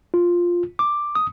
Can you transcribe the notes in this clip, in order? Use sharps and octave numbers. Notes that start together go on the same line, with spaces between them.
F4
D6
D#6